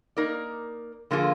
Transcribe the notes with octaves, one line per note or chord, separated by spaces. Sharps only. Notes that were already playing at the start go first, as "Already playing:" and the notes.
A#3 D#4 A#4 D5
D3 F3 A#3 F4 G#4